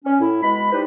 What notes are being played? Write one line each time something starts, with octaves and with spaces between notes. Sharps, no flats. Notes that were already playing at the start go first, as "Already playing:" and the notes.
C#4
A2 E4
B2 G#3 B5
G3 D#4 E4 B4 C5